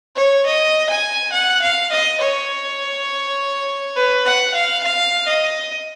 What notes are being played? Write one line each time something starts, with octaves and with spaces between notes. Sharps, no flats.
C#5
D#5
G#5
F#5
F5
D#5
C#5
B4
F#5
F5
F5
D#5